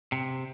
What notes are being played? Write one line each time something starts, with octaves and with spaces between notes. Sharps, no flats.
C3